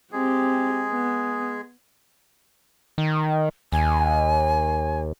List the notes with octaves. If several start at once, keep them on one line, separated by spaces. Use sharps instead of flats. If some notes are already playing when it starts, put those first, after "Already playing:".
G#3 C4 G4 G#4
B3
D#3
D#2 G#5